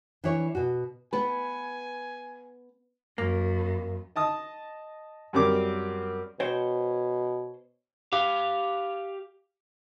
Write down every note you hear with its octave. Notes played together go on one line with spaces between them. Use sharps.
E3 D4 E4 C#5
B2 F#4
B3 B4 G#5
F#2 A#3
D#5 A5 D#6
F#2 G3 C4 A#4 D6
B2 C5 C#5 G5
G4 F5